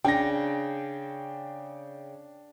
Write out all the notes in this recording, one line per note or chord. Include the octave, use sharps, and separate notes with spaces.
C#3 D4 G5 A#6